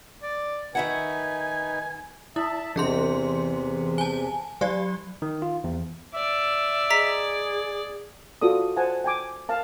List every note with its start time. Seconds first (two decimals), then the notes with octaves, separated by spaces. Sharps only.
0.23 D5
0.75 D#3 D#4 B4 E5 F#5 G#5
2.36 E4 E5 A5
2.76 E2 C3 E3 G#4 C6
3.98 G#5 A5
4.61 F#3 G4 D5
5.22 D#3
5.42 F4
5.64 E2
6.14 D5 E5
6.90 G#4 D#5 A#5 B6
8.42 F4 F#4 A4 D5 D#6
8.77 C5 F#5 G#5 A5
9.04 G5 G#5 D6
9.49 A#4 F5 A5